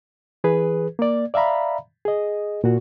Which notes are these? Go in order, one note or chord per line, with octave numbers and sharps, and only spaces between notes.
E3 G#4 B4
A#3 D5
D5 E5 F5 A#5 B5
G#4 D#5
A#2 F#4